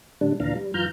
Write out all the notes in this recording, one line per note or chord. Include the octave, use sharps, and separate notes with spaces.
A2 D3 G3 D4
D2 A#2 E3 D4 F5 A#5
G3
F#2 E3 F4 A#5 F6 G6